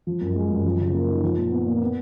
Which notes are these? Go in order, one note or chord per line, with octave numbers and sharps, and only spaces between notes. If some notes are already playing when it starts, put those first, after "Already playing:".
F3
F#2
G#3
F#2
F3
C#3
A#3
D#4
F3
A#2
B3
A#2
B3